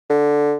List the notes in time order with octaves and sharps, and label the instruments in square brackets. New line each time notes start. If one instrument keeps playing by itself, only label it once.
[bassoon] D3